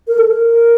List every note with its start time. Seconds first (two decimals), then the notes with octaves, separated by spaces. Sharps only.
0.08 A#4
0.18 A4
0.28 A#4